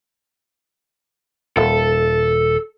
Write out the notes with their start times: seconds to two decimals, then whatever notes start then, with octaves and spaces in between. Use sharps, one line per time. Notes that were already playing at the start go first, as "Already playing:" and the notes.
1.57 D#1 A4